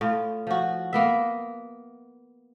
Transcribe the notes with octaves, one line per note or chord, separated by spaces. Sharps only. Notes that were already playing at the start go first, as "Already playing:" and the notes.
A2 F4
F3 F#4
A#3 B3 E5